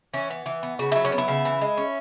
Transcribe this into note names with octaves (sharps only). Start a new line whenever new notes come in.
E3 C#4
B3
E3
B3
C#3 F#4
F#3 E4
C#4
B3
E4
C#3
E3
G#3
C#4